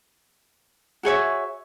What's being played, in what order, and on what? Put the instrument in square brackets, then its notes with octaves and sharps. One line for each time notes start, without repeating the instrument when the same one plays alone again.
[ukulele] F#4 G#4 C#5 E5